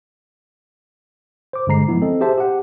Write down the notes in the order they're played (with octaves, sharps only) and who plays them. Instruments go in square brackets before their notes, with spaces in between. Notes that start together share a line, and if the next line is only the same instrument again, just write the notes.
[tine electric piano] C5 D6
G2 D3 G#3 A#5 C7
F3 G#3 B3 E4
C4 A4 D#5
G4 G#4 C5 E5 A5
G4 F#5